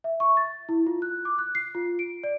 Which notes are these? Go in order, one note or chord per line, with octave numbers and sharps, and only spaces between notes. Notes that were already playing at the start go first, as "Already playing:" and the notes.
E5
C#6
A6
E4
F4
F#6
D6
F#6
C7
F4
D7
D5